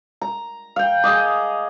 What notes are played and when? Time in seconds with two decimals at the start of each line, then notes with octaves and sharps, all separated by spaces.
0.21 A#5
0.76 F5 G5
1.04 G#4 D#5 D6